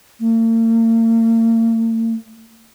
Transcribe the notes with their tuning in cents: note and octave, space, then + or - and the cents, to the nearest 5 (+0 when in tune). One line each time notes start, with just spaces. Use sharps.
A#3 -45